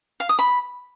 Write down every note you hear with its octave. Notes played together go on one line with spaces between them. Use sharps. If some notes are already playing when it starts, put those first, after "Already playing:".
F5
D#6
B5